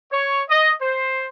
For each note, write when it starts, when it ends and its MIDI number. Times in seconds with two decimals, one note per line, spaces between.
0.11 0.42 73
0.49 0.72 75
0.80 1.26 72